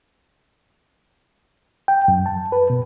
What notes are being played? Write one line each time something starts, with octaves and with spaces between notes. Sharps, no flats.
G5
F#2
A5
B4
B2